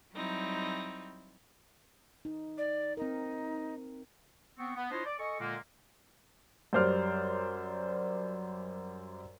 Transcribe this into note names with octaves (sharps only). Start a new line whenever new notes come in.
F#3 G3 C4 D#4 E4
D#4
D5
C4 D#4 A#4
B3 C4 C#6
B3
D4 E4 F4 C5 C#5 D#5
D5
A4 D#5 G#5 C#6
A#2 D3 G#3 A#3
F#2 G3 C5 D5 F6